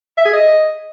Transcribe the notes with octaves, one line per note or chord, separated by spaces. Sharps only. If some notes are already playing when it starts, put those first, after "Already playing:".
E5
G#4
D#5